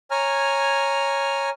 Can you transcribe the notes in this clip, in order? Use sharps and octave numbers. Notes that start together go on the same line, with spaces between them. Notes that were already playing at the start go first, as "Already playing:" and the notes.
C#5 G#5 A#5 F6